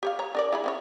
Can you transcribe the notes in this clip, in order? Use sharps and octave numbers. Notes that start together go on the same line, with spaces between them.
G4 C#5 F5
C#5 A#5
D4 A#4 D5
E4 G#4 B5
C4 C#4 C#5